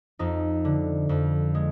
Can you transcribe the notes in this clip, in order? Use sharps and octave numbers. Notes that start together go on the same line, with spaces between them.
F2 D#4
D3
F2
G#3